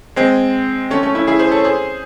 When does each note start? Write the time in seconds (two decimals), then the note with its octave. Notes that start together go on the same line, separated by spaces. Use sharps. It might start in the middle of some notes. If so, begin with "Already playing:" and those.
0.16 G#3 C4
0.91 A3 C#4
1.03 A3 C#4
1.15 C#4 E4
1.27 E4 G#4
1.39 G#4 C5
1.52 A4 C#5
1.64 G#4 C5